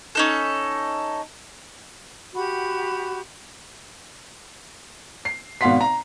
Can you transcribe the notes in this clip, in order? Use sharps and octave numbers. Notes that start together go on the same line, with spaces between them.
C#4 D#4 A4
F#4 G4 F#5 B5
C7
G#1 B2 F5 F#5 C6 B6
A#5